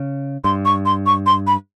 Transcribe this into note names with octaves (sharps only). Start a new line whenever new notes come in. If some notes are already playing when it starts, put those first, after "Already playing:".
Already playing: C#3
G2 C6
C#6
C6
C#6
C6
B5